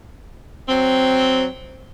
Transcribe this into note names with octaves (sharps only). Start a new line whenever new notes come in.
F#3 C4